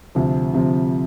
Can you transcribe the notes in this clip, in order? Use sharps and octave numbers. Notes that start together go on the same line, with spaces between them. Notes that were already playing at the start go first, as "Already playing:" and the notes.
D2 C3 F3
D2 C3 F3